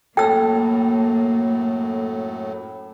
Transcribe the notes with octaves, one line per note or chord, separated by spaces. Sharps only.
F#2 A2 A#3 A4 G5 E6